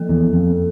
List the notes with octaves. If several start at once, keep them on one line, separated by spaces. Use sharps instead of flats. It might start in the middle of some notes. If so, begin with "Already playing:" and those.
Already playing: F3 A#3 A4
E2
F2